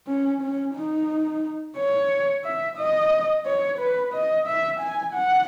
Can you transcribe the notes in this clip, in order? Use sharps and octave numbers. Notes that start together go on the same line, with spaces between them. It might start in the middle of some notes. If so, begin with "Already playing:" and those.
C#4
C#4
D#4
C#5
E5
D#5
C#5
B4
D#5
E5
G#5
F#5